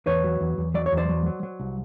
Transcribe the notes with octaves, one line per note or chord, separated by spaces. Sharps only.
E2 B4 C#5
F#3
E2
E2
F#3 D5
C#5
E2
C5 D5
F#3
F#3
F#3
C2